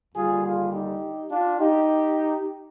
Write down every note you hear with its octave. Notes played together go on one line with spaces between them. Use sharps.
D#2 D3 G3 F4 G#4
F4 G#4
D#4 G4
D4 F4
D#4 G4